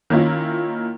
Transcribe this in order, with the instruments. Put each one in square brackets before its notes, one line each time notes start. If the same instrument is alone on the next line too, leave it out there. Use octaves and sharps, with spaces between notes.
[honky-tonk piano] D#3 A#3 C#4 E4 F4